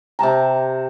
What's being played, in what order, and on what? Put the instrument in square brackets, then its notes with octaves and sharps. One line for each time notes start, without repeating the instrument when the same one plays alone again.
[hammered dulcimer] C3 G4 A5 A#5